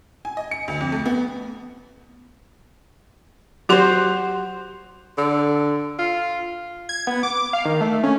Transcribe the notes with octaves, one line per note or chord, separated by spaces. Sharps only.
G#5
D#5
C#7
D2
F2
A3
B3
F#3 F#4 G4 C5 C6
D3
F4
G#6
B3
D6
F5
D#3
A3
C#4